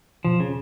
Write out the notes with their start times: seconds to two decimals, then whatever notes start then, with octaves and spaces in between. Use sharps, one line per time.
0.25 B2 F3
0.40 C#3